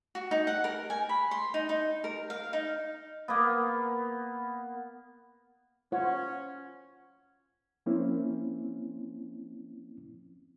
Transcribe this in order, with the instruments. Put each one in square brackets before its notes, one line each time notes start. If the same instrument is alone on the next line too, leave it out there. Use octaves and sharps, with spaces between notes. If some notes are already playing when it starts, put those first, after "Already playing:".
[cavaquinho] F#4
D#4
F#5
A#4
G#5
B5
C6
D#4
D#4
A#4
F5
D#4
[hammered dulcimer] A#3 B3
[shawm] C#4 [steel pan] F4 C5 C#5 [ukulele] F#5
[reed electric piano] F3 A#3 C4 C#4 E4